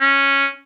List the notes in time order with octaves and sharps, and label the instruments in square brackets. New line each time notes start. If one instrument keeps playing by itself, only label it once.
[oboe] C#4